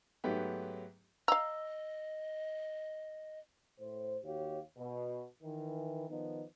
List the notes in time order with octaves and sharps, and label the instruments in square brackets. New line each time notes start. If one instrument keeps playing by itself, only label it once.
[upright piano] G#2 F#3 A3 B3 G4
[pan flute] D#5 [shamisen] F5 A#5 [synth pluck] E6
[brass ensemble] A2 C5
D#2 F#4 G4 C#5 F5
B2
D#3 E3
D#3 F3 B3 D#4